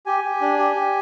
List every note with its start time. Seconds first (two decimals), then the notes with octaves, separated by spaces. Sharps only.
0.06 G4 G#5
0.24 G4
0.42 D4
0.59 G4
0.75 G4